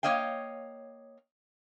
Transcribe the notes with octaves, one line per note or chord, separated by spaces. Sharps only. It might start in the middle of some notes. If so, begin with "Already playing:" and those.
A#3 C#5 D#5 F5 G5